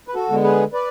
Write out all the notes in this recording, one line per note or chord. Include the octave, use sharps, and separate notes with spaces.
B4
F#4 A4
D3 G#3 B3
G#4 B4
B4 D5